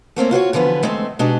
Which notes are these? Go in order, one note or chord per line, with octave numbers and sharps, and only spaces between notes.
A3 A#3 C4 C#4
F4 F#4 C5 C#5
D3 E3 F3 B3 B4
G#3 A3 C4
B2 G#3 D4 D#4 G4